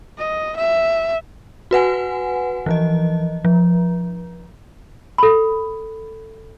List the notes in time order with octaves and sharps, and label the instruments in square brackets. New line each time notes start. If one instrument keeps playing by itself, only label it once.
[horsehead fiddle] D#5
E5
[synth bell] F#4 B4 F#5 G#5
E3 F3 D#5
F3
[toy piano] A4 B5